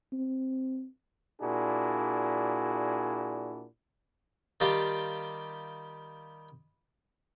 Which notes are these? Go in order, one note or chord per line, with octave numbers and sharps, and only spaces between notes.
C4
A#2 D4 E4 F#4 G#4
D#3 G3 F4 G4